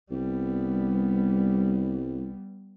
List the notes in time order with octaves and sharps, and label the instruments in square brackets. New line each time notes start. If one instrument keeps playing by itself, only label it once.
[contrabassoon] C2 [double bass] G3 B3